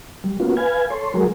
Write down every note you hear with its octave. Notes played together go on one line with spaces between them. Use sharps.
G3
A#3 B3 C#4 F4 F#4
B4 F5 G#5 G#6
A4 C#5 C6
F#3 G#3 F#4 G#4 A#4